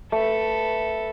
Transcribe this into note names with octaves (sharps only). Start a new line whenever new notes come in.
A3 A4 B4